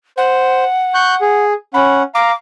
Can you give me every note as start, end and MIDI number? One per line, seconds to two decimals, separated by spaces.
0.17 0.64 72
0.17 1.44 78
0.94 1.15 85
0.94 1.15 90
0.94 1.15 91
1.21 1.53 68
1.74 2.03 61
1.74 2.03 78
1.74 2.02 83
2.15 2.31 77
2.15 2.31 82
2.15 2.34 86